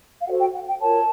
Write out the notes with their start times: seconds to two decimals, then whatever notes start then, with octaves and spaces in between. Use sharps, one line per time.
0.20 F5
0.26 F#4 A4 C5 F#5
0.39 G5
0.53 F#5
0.67 G5
0.80 F4 A#4 C#5 A5